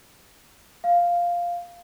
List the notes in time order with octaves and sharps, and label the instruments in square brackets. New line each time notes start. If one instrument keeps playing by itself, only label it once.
[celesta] F5